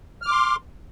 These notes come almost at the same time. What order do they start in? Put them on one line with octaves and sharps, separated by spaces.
F6 D6 C6